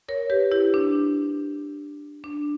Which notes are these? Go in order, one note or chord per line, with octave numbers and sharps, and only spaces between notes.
A#4 C#5
G4 B4
E4 G4
D4
D4